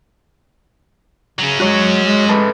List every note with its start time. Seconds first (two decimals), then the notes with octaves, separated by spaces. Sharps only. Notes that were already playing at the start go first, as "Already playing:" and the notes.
1.39 C#3 F#3 C#4
1.60 G#3 F#4 C#5
2.05 G#3
2.29 A3 B4 A5